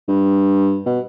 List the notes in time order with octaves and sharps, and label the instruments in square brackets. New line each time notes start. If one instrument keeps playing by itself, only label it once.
[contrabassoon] G2
B2